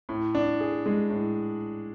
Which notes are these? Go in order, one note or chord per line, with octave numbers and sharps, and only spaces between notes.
A2
D4
G#4
G#3
A2